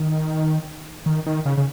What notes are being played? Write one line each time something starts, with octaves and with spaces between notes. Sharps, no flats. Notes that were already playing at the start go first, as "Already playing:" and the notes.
Already playing: D#3
D#3
D#3
C#3
C#3